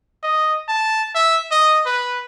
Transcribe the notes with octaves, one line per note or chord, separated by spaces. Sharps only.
D#5
A5
E5
D#5
B4